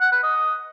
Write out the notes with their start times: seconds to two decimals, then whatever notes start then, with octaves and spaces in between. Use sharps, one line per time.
0.01 F#5
0.12 B4
0.23 D#5